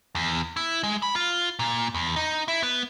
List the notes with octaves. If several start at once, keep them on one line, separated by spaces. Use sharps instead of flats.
E2
E4
G#3
B5
F4
A#2
E2
D#4
E4
B3